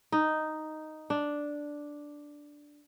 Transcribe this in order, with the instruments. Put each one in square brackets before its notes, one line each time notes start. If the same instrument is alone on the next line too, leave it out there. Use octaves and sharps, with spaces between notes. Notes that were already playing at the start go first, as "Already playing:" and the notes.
[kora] D#4
D4